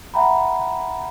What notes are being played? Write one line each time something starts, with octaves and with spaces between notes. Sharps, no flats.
E5 F#5 G5 A#5 B5